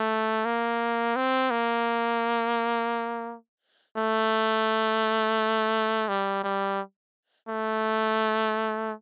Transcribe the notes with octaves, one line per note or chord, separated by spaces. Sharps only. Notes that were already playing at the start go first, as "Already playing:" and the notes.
Already playing: A3
A#3
C4
A#3
A3
G3
G3
A3